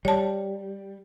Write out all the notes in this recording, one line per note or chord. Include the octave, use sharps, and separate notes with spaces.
G3 C#5 A5